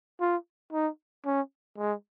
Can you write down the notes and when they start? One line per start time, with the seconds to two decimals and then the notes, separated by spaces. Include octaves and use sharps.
0.20 F4
0.73 D#4
1.25 C#4
1.78 G#3